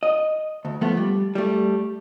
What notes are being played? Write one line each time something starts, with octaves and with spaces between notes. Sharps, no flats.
D#5
D2
F3 A3 B3
G3
G3 A3